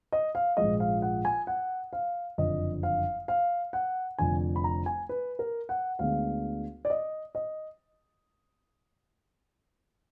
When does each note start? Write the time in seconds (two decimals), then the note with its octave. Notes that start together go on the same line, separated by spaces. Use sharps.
0.13 D#5
0.35 F5
0.57 A#1 G#2 F3 G#3 D#5
0.80 F5
1.02 F#5
1.25 G#5
1.47 F#5
1.93 F5
2.38 F#1 F2 D3 D#5
2.83 F5
3.28 F5
3.73 F#5
4.18 F1 F2 D3 G#5
4.56 B5
4.64 A#5
4.86 G#5
5.09 B4
5.39 A#4
5.69 F#5
5.99 D2 D3 G#3 B3 F5
6.85 D5
6.90 D#5
7.35 D#5